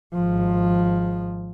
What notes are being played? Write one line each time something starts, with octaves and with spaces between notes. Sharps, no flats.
G#1 F3